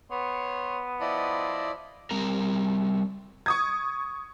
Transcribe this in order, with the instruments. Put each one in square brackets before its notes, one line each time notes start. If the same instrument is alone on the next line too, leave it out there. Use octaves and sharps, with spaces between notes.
[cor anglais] B3 [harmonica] C#5 C6
[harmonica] F3 D#5 C6 [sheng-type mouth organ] E4 D5
[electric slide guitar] G3 C4 A#4 A#5
[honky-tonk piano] C#6 D#6 G#6